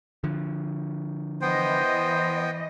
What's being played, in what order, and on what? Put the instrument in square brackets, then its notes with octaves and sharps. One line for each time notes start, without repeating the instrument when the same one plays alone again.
[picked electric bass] D3 F3
[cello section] E3 D#5 [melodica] B3 G5 [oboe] C5